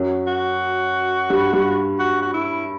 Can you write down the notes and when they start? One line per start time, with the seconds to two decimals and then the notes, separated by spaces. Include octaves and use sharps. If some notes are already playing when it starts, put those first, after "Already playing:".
Already playing: F#2 F#3
0.27 F#4
1.30 G2 G3
1.53 G2 G3
1.99 F#4
2.22 F#4
2.34 E4